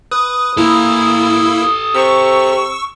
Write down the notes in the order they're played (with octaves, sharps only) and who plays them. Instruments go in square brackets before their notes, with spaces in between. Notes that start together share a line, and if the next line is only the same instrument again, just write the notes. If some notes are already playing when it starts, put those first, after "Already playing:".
[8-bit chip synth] B4 [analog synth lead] D#6
[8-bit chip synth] A#3 E4 E6 [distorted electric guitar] A4 B4
[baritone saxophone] C3 [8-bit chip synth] C#6 E6